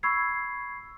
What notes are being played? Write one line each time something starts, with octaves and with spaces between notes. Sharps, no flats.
B5 C#6 E6 G#6 C7